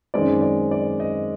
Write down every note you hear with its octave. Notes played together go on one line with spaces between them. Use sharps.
F#2 D#3 G#3 C4 D5
D5
D5
D#5